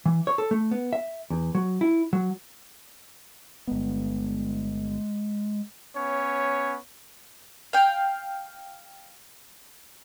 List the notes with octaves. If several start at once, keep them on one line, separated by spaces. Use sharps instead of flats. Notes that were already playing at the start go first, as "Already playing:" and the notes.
E3
C#5
A4
A3
B3
E5
E2
F#3
E4
F#3
G1 G#3 B3
B3 C#4 C#5
F5 G5